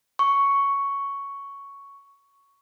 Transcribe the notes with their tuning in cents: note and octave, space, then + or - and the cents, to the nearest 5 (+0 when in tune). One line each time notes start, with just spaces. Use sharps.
C#6 +5